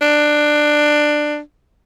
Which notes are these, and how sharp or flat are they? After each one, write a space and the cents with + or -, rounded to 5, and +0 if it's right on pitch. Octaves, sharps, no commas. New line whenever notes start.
D4 +15